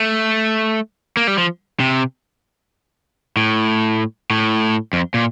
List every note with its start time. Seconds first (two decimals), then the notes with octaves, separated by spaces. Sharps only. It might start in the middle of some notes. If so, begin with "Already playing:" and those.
Already playing: A3
1.17 A#3
1.28 G3
1.38 F3
1.80 C3
3.37 A2
4.30 A2
4.93 F2
5.14 A#2